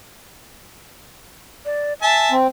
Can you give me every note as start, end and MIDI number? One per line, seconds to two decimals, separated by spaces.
1.65 1.93 74
2.02 2.33 76
2.02 2.32 80
2.02 2.33 81
2.31 2.47 60